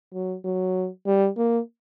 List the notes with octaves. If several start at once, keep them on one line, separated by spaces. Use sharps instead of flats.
F#3
F#3
G3
A#3